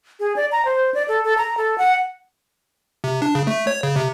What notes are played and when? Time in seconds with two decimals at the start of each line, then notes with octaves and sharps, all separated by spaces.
0.20 G#4
0.36 D5
0.52 A#5
0.65 C5
0.94 D5
1.08 A4
1.24 A4
1.38 A#5
1.57 A4
1.78 F#5
3.04 C3
3.22 D4
3.35 C#3
3.47 A3
3.67 C#5
3.83 C#3
3.96 C3